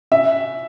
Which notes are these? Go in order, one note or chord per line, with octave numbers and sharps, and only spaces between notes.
C#4 E5